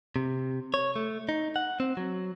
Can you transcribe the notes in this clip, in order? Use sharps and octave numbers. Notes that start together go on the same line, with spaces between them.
C3
C#5
A3
D#4
F#5
C4
F#3